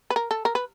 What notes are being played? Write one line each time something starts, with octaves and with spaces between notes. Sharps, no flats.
B4
A#4
A4
A#4
B4